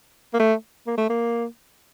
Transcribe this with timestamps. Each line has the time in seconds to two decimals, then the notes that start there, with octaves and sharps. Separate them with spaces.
0.34 A#3
0.40 A3
0.87 A#3
0.98 A3
1.10 A#3